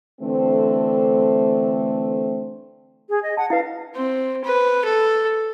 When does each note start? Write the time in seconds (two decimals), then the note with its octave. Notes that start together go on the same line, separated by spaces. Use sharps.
0.20 D3 E3 A3 C4
3.09 G#4
3.23 D#5
3.37 F#5 A5
3.50 E4 B4 F5
3.95 C4
4.45 B4
4.84 A4